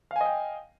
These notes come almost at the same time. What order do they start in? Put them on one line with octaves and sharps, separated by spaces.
F5 G#5 D#5 G5